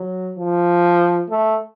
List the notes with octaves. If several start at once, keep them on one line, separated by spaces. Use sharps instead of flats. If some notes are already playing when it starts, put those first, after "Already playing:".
Already playing: F#3
F3
A3